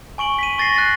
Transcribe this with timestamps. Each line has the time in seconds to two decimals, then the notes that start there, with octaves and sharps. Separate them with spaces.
0.18 G#5 C#6 D7 F#7
0.39 B6 D#7
0.58 C#6 A6 A#6 C7
0.74 F#6 A6 C7